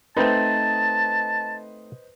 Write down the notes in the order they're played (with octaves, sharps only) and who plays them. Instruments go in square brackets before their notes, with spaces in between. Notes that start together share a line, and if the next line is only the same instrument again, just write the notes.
[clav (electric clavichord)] A3 C4 D#4 [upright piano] B4 C5 D#5 [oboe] A5